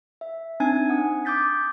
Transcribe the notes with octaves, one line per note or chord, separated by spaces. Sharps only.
E5
C4 D4 D#4 G#5 G#6
F#5 D#6
D6 D#6 G6 A6 B6